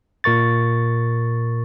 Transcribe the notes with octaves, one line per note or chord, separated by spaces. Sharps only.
A#2 A#4 C#6 A6